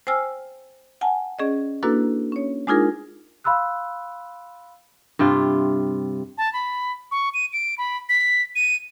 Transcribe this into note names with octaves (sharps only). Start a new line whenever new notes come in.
C5 G5 G#5 E6 F6
F#5 G#5 A5
C#4 G#4 D5 D#5
A#3 D4 E4 F#4 A4 B4
C#4 C#5
G#3 D4 D#4 F4 G#4 A#4
F5 B5 C6 E6 F#6
G2 C3 F4
A5
B5
C#6
D#7
D7
B5
B6
D#7